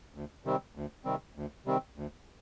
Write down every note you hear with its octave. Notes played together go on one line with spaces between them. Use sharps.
D2
C3 D#3 G3 C4
D2
C3 D#3 G3 C4
D2
C3 D#3 G3 C4
D2